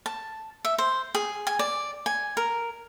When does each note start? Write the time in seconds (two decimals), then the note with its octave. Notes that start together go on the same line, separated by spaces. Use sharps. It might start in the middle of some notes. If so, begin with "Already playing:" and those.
0.06 A5
0.65 E5
0.78 C5
1.15 G#4
1.47 G#5
1.59 D5
2.06 G#5
2.37 A#4